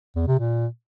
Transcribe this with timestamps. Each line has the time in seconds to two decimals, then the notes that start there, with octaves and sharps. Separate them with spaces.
0.16 E2
0.27 C3
0.39 A#2